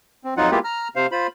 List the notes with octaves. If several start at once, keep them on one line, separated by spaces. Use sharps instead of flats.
C4
F2 F#3 D#4 F4 F#5
G#3 A#3 B3 E4 F4 G4
A#5 F6
C3 C5 F5
F4 C5 B5